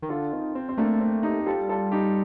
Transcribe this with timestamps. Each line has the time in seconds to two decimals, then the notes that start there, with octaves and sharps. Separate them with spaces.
0.02 D#3
0.09 D3 F4 A4
0.32 D#3 C4
0.55 C4
0.69 C4
0.77 A3 A#3 D4
1.01 C4
1.23 D#4 G4
1.46 G3 F4 A4
1.69 F4 A4
1.92 D#4 G4